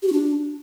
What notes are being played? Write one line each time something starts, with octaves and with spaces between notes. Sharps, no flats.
G4
F#4
D4